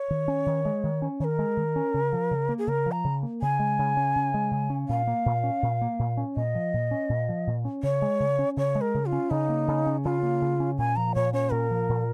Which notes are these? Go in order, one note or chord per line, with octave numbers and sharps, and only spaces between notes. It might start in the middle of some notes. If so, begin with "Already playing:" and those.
Already playing: C#5
D#3
C#4
D#3
G#3
D#3
C#4
D#3 A#4 C#5
G#3
D#3
C#4
C#3
F3
C#3
A#3
G#4
C#3 A#4
F3
A#5
C#3
A#3
C#3 G#5
G#3
C#3
C#4
C#3
G#3
C#3
C#4
A#2 F5
A#3
A#2
C#4
A#2
A#3
A#2
C#4
A#2 D#5
F3
A#2
C#4
A#2
F3
A#2
C#4
C#3 C#5
G#3
C#3
C#4
C#3 C#5
G#3
A#4
C#3
F4
C#4
C#3 D#4
A#3
C#3
C#4
C#3 F4
A#3
C#3
C#4
A#2 G#5
F3 A#5
A#2 C#5
C#4 C#5
A#2 A#4
F3
A#2